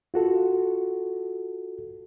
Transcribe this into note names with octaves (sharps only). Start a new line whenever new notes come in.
F4 F#4 A4